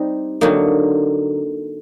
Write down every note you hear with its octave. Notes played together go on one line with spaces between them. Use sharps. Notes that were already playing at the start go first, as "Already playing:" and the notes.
Already playing: G3 C4 D#4
D3 F#3 A#3 D#4